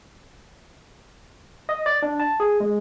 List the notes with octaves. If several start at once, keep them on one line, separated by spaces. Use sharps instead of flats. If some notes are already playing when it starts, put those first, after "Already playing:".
D#5
D5
D4
A5
G#4
G#3